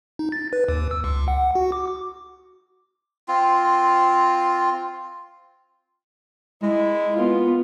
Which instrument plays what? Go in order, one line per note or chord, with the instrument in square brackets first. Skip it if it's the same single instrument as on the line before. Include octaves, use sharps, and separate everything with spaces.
[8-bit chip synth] D#4
A6
B4
D#2
E6
C#2
F#5
F#4
D6
[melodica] C4 F4
[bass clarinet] G#3 [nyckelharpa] E4
[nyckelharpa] B3 F4